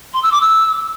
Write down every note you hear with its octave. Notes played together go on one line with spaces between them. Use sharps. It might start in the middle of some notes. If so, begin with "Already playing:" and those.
C6
E6
D6
E6